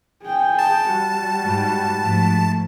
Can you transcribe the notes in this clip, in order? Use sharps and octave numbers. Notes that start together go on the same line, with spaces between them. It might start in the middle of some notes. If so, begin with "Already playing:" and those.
G#4 G5
A5
G3 F#4
G#2
G#2 F3 A3